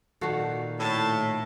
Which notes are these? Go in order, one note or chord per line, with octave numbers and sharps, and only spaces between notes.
A#2 D#3 F#4 A4 F5
A2 A5